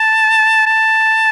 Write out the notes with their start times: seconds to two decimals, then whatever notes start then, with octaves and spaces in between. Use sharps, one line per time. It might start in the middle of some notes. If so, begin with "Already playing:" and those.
Already playing: A5
0.66 A5